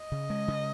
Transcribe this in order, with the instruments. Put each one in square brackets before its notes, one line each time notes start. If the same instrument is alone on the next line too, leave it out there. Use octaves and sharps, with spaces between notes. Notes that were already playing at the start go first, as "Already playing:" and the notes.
Already playing: [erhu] D#5
[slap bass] C#3
G#3
C#3